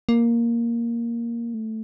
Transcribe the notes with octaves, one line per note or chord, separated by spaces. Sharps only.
A#3
A3